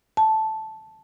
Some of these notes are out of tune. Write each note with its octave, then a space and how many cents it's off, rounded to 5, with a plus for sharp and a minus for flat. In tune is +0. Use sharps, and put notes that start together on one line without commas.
A5 -5